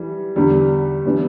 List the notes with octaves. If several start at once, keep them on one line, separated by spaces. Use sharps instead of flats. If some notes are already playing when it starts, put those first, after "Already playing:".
Already playing: E3 G3
E2 D3 G3
E3 G3 B3 D4